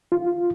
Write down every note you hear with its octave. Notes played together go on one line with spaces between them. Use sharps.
F4